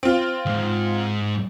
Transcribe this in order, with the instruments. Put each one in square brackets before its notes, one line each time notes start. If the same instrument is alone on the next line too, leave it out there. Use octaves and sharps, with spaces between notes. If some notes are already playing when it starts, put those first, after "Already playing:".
[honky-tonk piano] C4 F4
[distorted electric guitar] D#2 G#2